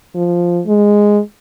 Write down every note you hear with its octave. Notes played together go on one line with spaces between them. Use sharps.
F3
G#3